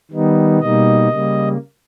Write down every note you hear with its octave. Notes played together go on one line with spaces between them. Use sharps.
D#3 G3 B3 D#4
B2 G3 A#3 D#4 D#5
C#3 G3 A#3